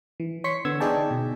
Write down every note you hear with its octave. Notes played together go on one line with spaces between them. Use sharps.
E3
C#5 C6 C#6 B6 C#7
D3 B3 E6 G#6
D#4 G#4 D5 G5 A5
B2